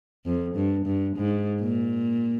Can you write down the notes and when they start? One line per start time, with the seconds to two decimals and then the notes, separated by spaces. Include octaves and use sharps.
0.26 F2
0.55 G2
0.86 G2
1.16 G#2
1.61 A#2